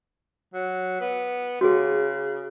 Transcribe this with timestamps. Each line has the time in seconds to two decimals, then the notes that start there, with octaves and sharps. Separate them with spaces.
0.54 F#3
1.01 B3
1.61 C#3 F#4 G#4